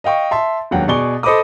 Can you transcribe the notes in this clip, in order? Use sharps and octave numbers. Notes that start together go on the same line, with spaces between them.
D#5 F5 G5 C#6
E5 A5 C6
E1 D#2 F#3 F#5 G5
B2 G#4 D5 C#6 G7
A4 C5 D#5 B5 D6 D#6